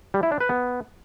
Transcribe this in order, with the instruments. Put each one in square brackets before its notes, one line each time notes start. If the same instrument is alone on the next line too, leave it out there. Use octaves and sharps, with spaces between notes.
[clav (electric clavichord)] G3
E4
D4
B4
B3